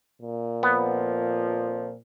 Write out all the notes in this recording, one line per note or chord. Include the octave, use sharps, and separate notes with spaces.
A#2
F2 F3 B3